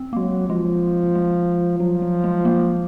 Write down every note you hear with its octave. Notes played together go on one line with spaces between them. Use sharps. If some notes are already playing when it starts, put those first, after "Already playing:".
Already playing: C4
A#3
F#3 G#3
F3 G#3
G#3
F3 F#3
F#3
G#3
A#3